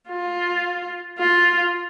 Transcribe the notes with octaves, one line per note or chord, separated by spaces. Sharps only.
F4
F4